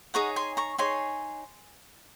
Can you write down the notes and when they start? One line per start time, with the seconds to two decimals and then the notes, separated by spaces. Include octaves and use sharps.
0.14 D#4 G#4 C#5 F#5 A#5
0.36 G#5 C6
0.57 A#5 C#6
0.78 D#4 G#4 C#5 G#5 C6